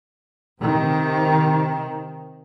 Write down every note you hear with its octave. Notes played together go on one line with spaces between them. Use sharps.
C3 D#3